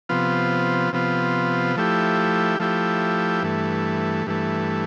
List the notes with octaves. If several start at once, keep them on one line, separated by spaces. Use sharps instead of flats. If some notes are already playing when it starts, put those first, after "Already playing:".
C3 F3 B3 F4
C3 F3 B3 F4
F3 A3 E4 G4
F3 A3 E4 G4
G2 E3 A3
G2 E3 A3